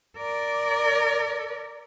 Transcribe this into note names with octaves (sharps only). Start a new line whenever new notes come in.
A#4 D5